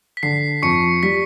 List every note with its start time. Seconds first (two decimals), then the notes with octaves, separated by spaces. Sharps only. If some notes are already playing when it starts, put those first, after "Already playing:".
0.17 B6
0.23 D3 C7
0.62 F2 C#6 C#7
1.03 G3 B6